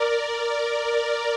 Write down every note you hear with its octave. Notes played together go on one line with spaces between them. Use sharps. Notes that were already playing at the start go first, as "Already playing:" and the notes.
Already playing: A#4 D5
A#4 D5